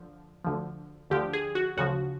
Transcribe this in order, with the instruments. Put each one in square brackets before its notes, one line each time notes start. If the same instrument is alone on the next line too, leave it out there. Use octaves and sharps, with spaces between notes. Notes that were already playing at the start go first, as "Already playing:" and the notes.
Already playing: [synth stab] D3 F3
D2 D3 F3
D2 D3 F3 G4
G#4
F#4
D2 C#3 F3 F#4